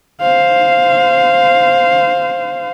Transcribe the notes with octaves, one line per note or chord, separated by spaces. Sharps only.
C5 F5